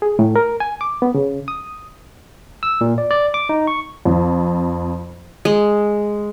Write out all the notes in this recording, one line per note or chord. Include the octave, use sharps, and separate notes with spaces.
G#4
A2
A#4
G#5
D6
B3
C#3
D#6
E6
A#2
D5
D5
D6
D#4
C#6
F2
G#3